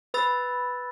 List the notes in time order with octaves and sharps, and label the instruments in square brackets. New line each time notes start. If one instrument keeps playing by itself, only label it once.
[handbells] B4 [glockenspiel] B5 E6 A6